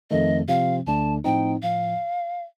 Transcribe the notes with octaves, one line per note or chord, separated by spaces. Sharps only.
F2 D#3 A3 D#5
C3 F3 C4 F5
D2 D3 A3 D4 A5
A2 F3 C4 D#4 G5
A2 F3 F5